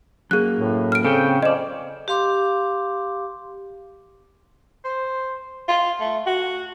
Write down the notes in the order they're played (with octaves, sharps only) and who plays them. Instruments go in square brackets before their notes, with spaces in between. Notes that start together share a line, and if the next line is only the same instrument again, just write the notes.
[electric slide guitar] F#2 A#3 [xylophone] G#4 F#6
[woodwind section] A2
[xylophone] F6 D7
[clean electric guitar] C#3 [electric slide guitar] C4 [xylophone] A4 [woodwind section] G5
[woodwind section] F3 C#4 [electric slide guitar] C5 D5 [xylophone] D#5 E7
[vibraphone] G4 F5 C6 D6
[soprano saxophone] C5
F4
A3
F#4